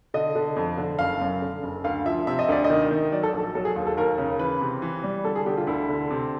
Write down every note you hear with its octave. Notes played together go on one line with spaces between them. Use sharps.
D3 D#5
D3
F2
D3
F#1 F5
F#2
D3
F#1
D2 F5
F3 E5
C3 E5
D#5
D2 D5
D#5
D#3
D#3
F#3 D5
A4
A#1
A4
F#3 A4
G#4
D#2
A4
D#2 A#4
C#3
E3 B4
C3
E3
G3
D3 A4
G#4
D3 G4
F4
D2 E4
D3
C3